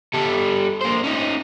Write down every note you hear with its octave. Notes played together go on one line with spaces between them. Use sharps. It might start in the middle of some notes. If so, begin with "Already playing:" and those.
G3 A4
A#3 C5
C#4 D#4